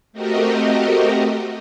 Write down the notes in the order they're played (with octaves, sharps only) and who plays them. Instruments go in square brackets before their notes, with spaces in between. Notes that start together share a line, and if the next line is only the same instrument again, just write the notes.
[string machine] A3 C4 F#4 G4 A#4 D#5